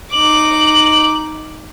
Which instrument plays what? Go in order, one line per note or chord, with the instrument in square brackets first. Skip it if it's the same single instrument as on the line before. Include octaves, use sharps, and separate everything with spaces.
[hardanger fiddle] D#4 D6 [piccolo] F#7